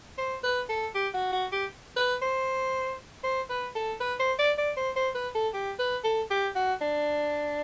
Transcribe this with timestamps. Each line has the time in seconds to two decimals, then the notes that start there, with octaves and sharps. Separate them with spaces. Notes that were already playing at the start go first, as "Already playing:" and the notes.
0.18 C5
0.43 B4
0.69 A4
0.95 G4
1.14 F#4
1.33 F#4
1.52 G4
1.97 B4
2.22 C5
3.24 C5
3.50 B4
3.75 A4
4.01 B4
4.20 C5
4.39 D5
4.58 D5
4.77 C5
4.96 C5
5.15 B4
5.35 A4
5.54 G4
5.79 B4
6.04 A4
6.31 G4
6.56 F#4
6.81 D4